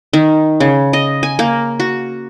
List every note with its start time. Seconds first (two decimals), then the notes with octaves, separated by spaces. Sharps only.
0.13 D#3
0.60 C#3
0.93 D#5
1.23 G#5
1.39 A#3
1.80 F#4